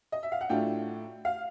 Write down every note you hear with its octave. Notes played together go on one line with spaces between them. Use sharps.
D#5
E5
F5
F#5
A2 F#3 A3 D4 F4 G5
F5